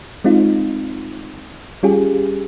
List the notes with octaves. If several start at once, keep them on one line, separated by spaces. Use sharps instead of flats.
G#3 C4 D#4 F4
G3 C#4 F4 G4 G#4